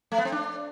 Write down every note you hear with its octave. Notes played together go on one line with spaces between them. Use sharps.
A3
B3
C4
D4